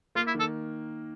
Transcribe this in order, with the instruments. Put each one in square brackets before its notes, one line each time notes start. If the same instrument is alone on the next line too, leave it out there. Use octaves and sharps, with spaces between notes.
[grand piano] A#3 [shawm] F4
[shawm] E4
[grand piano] D#3
[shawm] A4